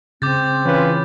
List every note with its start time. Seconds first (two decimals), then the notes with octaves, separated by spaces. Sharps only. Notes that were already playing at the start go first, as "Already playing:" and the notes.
0.22 C#3 C4 D6 G6 A6
0.65 E3 C#4 F4 B4